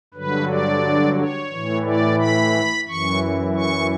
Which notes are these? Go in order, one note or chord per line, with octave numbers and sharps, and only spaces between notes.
G2 D3 F#3 B4
D5
C#5
A2 E3
D5
B5
F#2 E3 C#6
C#6